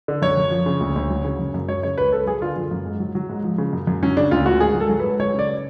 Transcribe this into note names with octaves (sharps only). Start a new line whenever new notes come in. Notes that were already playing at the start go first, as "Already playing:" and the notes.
D3
F#2 C#5
F#2
F3
C#3
D2
D2
F#3
C#3
F#2
F#2
F#3 C#5
C#3 C#5
C#2 B4
C#2 A4
F#3 G#4
D3 F4
F#2
F#2
G#2
F#3
F#3
G#2
F3
C#3
F#2
F#2
F#3 C#4
C#3 D4
D2 F4
D2 F#4
G#2 G#4
F#3
A4
F#3
B4
G#2
F#3 C#5
C#3 D5